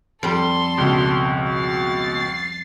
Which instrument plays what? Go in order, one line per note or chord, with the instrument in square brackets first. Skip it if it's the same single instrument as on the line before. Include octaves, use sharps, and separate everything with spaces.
[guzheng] F2 G3 [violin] A4 C6
[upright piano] C#2 B2
[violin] A6 C7